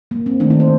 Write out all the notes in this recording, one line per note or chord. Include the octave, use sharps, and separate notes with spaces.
A#3
C4
D#3 A3 D4
D#4
C5